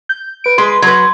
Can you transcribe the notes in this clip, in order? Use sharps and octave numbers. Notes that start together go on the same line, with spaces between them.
G6
B4 D7
G#3 B4 C6
F#3 B4 C6 G#6